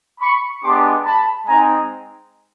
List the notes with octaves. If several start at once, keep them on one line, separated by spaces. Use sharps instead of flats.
B5 C#6
G#3 B3 D4 G4 C6 D6
A5 B5
G#3 C4 D#4 G#5 A#5